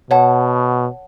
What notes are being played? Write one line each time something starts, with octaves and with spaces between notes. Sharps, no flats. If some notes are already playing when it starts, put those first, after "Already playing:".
B2 C#5 F#5 A5